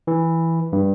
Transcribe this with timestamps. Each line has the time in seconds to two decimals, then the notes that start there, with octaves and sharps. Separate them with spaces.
0.07 E3
0.73 G2